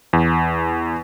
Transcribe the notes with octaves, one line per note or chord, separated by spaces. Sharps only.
E2